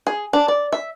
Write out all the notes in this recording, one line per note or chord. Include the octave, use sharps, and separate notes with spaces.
G#4
D4
D5
E5